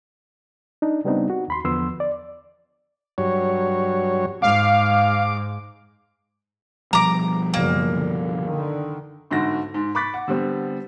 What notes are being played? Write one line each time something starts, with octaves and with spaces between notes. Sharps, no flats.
D4 D#4
C#3 G3 B3 C4 D4 D#4
F#4
D#2 B5 C6
E2 D3 F3 B3 C6 E6
D5
G2 F#3 C#5
G#2 F5 D6
B2 F3 G3 A#5 D6
F#1 A#3
D3
D3 D#3
G1 G#2 D3 F#4 A#6
G#2
B5 C#6 D6 F#6 A6 B6
F#5
D3 G3 B3 C4